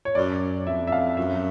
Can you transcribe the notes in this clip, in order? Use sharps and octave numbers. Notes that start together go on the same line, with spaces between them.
C#5
F#2 D5
F2 E5
E5
F5
F#2 E5